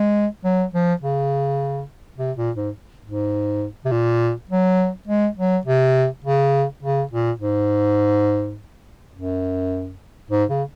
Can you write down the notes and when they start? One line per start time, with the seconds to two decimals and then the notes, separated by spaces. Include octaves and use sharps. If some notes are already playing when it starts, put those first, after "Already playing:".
Already playing: G#3
0.44 F#3
0.73 F3
1.01 C#3
2.18 C3
2.37 A#2
2.56 G#2
3.05 G#2
3.85 C3
3.91 A#2
4.49 F#3
5.07 G#3
5.37 F#3
5.65 C3
6.24 C#3
6.83 C#3
7.11 A#2
7.40 G#2
9.14 F#2
10.30 G#2
10.49 C#3